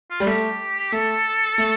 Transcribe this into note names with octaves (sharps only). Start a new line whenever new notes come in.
F4
G3
A3 G4
A3 A4
A3